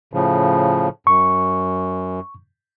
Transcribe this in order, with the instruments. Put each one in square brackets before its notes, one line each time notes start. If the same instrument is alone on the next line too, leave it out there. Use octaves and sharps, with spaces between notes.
[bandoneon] A2 C#3 F3
[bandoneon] F#2 [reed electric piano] C#6